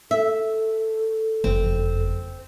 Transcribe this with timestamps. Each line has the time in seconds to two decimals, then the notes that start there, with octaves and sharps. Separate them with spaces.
0.11 A4 E5
1.44 F#1 F2 C4